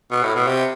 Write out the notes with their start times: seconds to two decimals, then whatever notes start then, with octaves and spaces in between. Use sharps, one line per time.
0.11 B2
0.23 A2
0.35 B2
0.47 C3